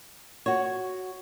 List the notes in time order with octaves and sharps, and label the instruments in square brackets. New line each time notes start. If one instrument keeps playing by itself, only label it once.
[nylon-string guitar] F#4 C#5